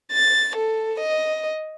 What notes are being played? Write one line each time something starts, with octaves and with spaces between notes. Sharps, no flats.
A6
A4
D#5